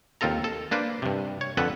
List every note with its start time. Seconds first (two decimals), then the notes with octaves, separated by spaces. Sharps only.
0.21 D#2 C4 F4 A4 A#5
0.44 A4
0.71 A#3 D4 B4 C5
1.02 G2 C3
1.41 C#5
1.57 F2 D3 A4 B4 F#5